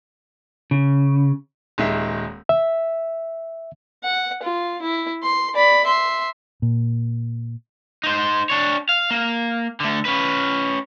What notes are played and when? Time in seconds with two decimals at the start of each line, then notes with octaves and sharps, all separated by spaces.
0.71 C#3
1.78 D#1 D#3 G#3 E5
2.49 E5
4.04 F#5
4.42 F4
4.82 E4
5.23 C6
5.55 D5 B5
5.85 E5 C6
6.62 A#2
8.04 D#4 C5
8.50 D4 C#5
8.89 F5
9.11 A#3
9.80 D3 A3
10.05 C#4 B4